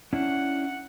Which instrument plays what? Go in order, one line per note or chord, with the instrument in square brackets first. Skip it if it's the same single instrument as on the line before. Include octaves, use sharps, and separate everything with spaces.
[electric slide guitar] C#4 D4 E4 [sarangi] F#5